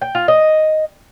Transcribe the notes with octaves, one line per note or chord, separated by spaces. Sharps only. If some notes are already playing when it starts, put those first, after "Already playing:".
G5
F4
D#5